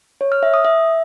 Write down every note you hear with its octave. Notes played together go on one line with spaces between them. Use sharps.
C#5
F6
E5
D#6
E5